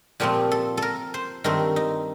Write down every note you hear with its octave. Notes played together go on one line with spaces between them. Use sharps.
A#2 F3 A3 C4 G4
A4
A4 A#4
C5
G2 D#3 A3 C4 A#4
D#4